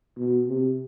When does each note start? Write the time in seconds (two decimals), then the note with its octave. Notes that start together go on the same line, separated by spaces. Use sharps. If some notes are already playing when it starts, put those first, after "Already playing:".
0.17 B2
0.48 C3